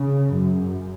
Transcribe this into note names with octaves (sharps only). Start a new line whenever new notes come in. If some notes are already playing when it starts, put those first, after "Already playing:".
Already playing: C#3
F#2